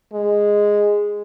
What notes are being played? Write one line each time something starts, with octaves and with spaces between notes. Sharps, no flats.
G#3